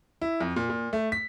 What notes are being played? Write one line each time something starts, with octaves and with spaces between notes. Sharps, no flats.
E4
F2
A#2
A#2
A3
B6